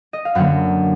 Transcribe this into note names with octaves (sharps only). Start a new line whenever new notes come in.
D#5
F5
F#2 D3 F#3 A#3 F#5